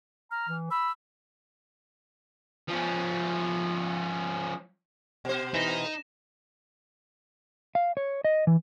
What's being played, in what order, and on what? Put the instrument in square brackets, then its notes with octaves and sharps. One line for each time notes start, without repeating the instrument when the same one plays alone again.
[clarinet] A#5 [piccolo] F6
[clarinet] E3
[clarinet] B5 [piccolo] E6
[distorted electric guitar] F3 C#4
[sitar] B2 C5
[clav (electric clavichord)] E3 [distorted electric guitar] D#4 [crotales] A#6 E7
[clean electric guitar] F5
C#5
D#5
E3